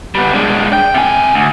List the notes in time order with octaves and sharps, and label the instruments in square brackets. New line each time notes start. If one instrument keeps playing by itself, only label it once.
[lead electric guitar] G3 B3
G#3 D4
G5
C3 G#5
D2